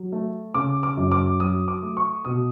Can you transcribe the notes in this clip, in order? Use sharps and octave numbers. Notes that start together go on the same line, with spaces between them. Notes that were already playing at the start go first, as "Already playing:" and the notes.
Already playing: F#3
A3
C#3 D6
D6
F#2
D6
F#3 D#6
D6
A3
C#6
B2 D#6